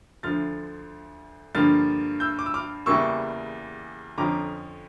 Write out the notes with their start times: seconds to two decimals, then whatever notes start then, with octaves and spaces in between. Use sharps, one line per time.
0.23 D2 D3 F3 F6 A6
1.55 G2 D3 F3 A#3 F6 A6
2.20 E6 G6
2.39 D6
2.46 E6
2.54 D6 F6
2.86 E2 C#3 E3 G3 A#3 C#6 E6
4.18 F2 D3 F3 C#4 A#5 D6